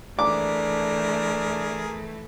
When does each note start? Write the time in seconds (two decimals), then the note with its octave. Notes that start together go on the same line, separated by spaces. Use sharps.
0.19 E3 A3 D4 G#4 A#4 D6